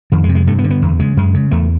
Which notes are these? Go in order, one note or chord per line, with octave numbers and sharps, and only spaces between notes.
F2 D#3
G#3
C3
G#3
G2 A3
B3
D3
B3
E2
C#3 G#3
F#2 G#3
C#3
E2 A3